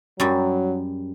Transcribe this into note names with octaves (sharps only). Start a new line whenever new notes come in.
F#2 F#3 G3